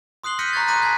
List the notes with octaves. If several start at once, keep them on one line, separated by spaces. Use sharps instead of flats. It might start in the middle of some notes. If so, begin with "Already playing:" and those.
C6 D#6 F#6 C7 F#7 G7
F6 G6 A#6 B6 C#7 D#7
A#5 B5 C#6 F#6 G#6 A6
C6 D6 F#6 A6 A#6 D#7
G#5 A5 F#6 G#6 B6